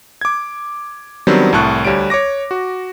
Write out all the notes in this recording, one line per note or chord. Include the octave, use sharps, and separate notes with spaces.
D6 G#6
D#3 F#3 G3 B3 C4 D4
C2 A2 A5 C#6 F#6
D2 G3 C#5 D7
C#5 C#6 D6 A#6
F#4